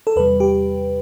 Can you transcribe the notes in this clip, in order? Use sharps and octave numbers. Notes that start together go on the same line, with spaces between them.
A4
E2 C3 G3 B4
G4